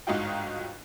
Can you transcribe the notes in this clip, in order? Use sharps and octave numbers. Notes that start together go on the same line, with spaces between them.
G1 G#2 D#4 F4 F#4 G5